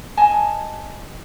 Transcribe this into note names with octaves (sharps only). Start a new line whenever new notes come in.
D#5 G#5 A5